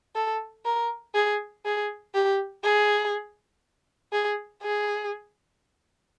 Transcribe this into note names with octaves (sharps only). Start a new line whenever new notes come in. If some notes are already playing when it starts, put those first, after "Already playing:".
A4
A#4
G#4
G#4
G4
G#4
G#4
G#4